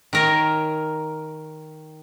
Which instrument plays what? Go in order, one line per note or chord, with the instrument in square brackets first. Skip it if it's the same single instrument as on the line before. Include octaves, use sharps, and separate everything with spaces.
[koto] D#3 A#4 C#5